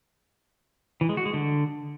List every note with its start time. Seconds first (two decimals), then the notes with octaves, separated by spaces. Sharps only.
1.01 E3
1.09 G#3
1.17 F#4
1.25 G#3
1.34 D3